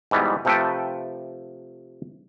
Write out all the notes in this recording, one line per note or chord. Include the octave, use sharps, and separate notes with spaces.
G#2 B2 E3 G3 B3
C3 F3 A3 A4 B4 G5